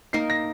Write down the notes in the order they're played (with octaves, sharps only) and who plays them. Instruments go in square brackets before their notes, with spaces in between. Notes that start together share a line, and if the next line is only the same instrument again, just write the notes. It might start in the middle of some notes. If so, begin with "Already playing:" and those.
[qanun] A#3 D#4 A#4 [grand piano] C7
[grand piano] A#6